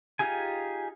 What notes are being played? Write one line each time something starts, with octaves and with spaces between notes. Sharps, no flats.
D#4 F4 G4 G#4 G#5